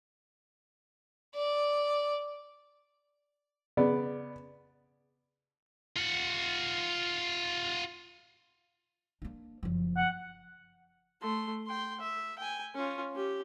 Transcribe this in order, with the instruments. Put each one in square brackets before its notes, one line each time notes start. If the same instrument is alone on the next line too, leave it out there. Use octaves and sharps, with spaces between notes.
[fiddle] D5
[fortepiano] C#3 B3 D5
[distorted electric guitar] F4 F#5
[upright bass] A#3 D4
F#1 F3
[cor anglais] F#5
[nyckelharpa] A3 C6
G5 C6
E5
G5 G#5
C#4 F4
C#4 G4